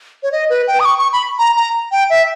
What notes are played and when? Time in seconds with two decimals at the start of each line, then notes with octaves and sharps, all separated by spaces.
0.23 C#5
0.32 D#5
0.50 B4
0.67 G5
0.80 D#6
0.85 C#6
0.99 C#6
1.13 B5
1.39 A#5
1.56 A#5
1.92 G5
2.10 E5